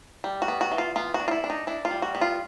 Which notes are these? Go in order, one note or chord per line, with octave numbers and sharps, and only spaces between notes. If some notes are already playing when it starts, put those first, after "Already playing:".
G3
F#4
B3
F#4
E3
F4
B3 F4
F#4
D4
F4
E4
D4
D#4
D4 E4
F4
G3
F#4
B3
F4